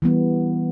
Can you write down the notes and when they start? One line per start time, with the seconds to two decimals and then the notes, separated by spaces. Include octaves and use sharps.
0.02 E3 G3 B3